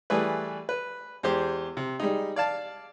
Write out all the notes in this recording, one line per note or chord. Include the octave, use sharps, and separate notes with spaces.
E3 G3 A3 G#4 B4
B4
E2 G#3 G4 C5
C3
G3 G#3 D#4
D5 F5 A5